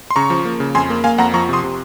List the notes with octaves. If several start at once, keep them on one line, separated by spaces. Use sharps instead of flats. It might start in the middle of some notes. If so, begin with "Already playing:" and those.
C6
C#3 A#5 C#6
F3
A#3
C#3
F2 G#5 C6
A#3
A#3 F5 G#5
F2 F#5 A#5
F3 A#5 C#6
C3 C6 D#6
C3